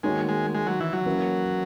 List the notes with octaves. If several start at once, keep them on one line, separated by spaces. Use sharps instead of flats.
D#3 G#3 A#3 D#4 F#4 C#5
G#3
G#3
F#3
E3
F#3
E3 A#3 C#4 E4 A#4